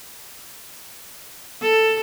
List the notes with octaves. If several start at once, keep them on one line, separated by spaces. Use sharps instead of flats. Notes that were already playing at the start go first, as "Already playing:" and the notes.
A4